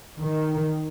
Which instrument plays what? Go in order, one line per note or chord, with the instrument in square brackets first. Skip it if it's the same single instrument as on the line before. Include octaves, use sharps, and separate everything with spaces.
[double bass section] D#3